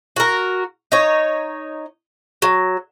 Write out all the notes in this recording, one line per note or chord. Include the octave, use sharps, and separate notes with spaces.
F#4 A#4
D#4 C#5
F#3